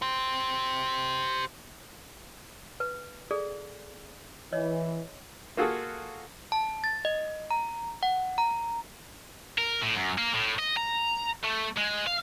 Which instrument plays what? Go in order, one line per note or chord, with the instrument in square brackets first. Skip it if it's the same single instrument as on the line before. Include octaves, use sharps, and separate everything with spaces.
[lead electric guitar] G4 C5
[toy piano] B4
G#4 A4 D5
[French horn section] E3 [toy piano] C#5 D#5
[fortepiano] A#3 F4 F#4 G#4 A4
[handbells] A5
A6
D#5
A#5
F#5
A#5
[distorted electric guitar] A#4
A2
F#2
A#3
A2
D#5
A#5
A3
G#3
F5